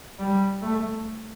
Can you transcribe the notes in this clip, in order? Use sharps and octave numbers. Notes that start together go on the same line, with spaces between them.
G3
A3